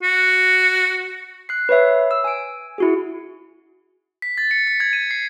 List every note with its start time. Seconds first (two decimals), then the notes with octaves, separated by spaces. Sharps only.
0.03 F#4
1.49 F#6 C7
1.69 B4 C#5 E5
2.11 E6
2.24 G#5 D7
2.78 E4 F#4 G#4
4.22 B6
4.38 A6
4.51 C#7
4.67 B6
4.80 G#6
4.93 D#7
5.11 C7